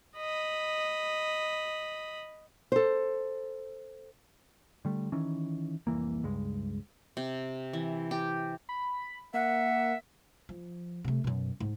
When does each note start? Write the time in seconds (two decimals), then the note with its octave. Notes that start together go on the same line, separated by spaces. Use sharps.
0.17 D#5 B5
2.72 A4 C5
4.85 D3 G3 A3
5.12 D#3 E3 C#4
5.87 F1 C2 E3 A#3
6.23 C#2 G2 G#3
7.17 C3
7.73 E3
8.11 G4
8.69 B5
9.34 A#3 E5 F#5
10.49 F3
11.05 C3 A3
11.24 F#2 B2
11.60 G#2